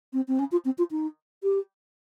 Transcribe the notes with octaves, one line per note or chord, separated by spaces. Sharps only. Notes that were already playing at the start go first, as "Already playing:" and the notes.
C4
C4
C#4
F4
C4
F4
D#4
G4